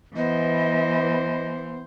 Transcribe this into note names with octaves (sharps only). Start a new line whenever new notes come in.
E3 B3 C5 D#5